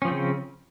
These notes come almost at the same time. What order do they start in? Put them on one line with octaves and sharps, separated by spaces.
C#4 F3 C4 C#3